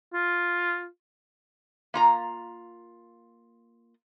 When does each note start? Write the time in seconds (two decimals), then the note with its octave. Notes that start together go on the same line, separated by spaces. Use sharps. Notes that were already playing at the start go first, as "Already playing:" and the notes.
0.14 F4
1.94 A#3 F4 A#5